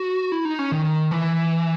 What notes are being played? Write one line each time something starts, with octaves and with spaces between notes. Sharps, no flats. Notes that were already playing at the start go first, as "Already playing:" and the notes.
Already playing: F#4
E4
D#4
C#4
D#3
E3